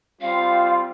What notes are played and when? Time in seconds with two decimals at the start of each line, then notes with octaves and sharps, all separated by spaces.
0.21 G3 C4 F4 F5